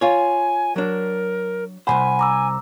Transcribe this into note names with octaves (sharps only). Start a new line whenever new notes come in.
F4 C#5 G#5
F#3 D4 A#4
C2 A#2 C5 F#5 G#5 B5
A#5 D6 E6